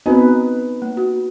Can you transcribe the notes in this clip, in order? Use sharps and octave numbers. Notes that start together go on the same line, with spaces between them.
B3 C4 D#4 F#4 B4
A#3
F#4